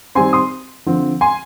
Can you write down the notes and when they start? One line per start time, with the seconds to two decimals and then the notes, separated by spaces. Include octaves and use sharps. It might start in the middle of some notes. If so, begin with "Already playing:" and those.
0.15 D#3 G3 C4 G#5 C6
0.33 C6 D#6
0.86 D3 F3 C4
1.21 G#5 C6